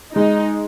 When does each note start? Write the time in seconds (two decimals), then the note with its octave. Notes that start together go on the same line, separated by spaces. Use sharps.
0.15 G#3 D#4